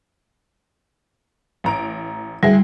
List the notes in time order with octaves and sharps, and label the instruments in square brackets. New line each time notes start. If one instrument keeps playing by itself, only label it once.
[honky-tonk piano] A1 A#5 D7
[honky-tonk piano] D2 E4 G#4 [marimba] G3